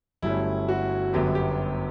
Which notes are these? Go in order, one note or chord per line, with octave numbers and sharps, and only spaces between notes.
G1 G2 F#3 A3 C#4 E4
F#4
G1 F#2 D3 F#3 B3 G4
G4